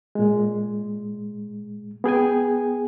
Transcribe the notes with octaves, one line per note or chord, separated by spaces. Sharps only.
A#2 G#3
B3 G#4 G5 G#5